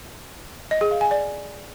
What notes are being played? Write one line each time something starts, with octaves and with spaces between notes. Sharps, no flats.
D#5
G#4
F5
G#5
D5